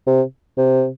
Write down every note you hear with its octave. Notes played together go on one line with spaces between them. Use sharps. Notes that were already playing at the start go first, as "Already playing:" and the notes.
C3
C3